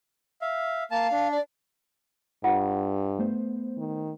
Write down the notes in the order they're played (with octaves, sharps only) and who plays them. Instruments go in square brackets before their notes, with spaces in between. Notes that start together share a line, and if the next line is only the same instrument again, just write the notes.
[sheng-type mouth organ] E5 F5
[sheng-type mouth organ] A#3 A5 [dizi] F5
[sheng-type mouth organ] D4
[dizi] D5
[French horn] G2 [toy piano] F4 F#5
[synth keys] A3 B3 C5
[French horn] D#3